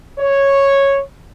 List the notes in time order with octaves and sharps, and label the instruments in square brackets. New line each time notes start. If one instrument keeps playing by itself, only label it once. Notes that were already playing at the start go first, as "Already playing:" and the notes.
[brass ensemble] C#5